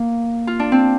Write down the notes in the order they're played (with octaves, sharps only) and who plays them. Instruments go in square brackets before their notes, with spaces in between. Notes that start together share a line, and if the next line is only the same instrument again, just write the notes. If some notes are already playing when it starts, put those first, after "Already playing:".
Already playing: [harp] A#3
F4
D4
C4